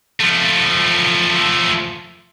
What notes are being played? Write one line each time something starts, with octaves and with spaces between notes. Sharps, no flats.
F3 A3